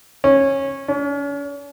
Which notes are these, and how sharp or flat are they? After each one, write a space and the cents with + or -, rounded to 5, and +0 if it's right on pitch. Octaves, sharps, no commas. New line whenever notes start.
C#4 -15
C#4 +40